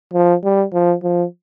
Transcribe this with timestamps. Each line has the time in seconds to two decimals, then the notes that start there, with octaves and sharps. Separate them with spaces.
0.14 F3
0.44 G3
0.73 F3
1.03 F3